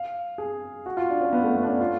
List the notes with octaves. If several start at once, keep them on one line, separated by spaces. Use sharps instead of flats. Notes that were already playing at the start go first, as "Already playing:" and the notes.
Already playing: F5
G#4
F#4
F4
D4
C#4
B3
A3
B3
D4
C#4
F4